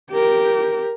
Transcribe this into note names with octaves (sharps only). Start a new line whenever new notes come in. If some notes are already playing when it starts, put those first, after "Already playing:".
G4 A#4